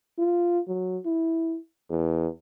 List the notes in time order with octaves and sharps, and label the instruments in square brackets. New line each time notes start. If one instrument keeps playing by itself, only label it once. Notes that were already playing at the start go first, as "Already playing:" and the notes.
[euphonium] F4
F#3
E4
E2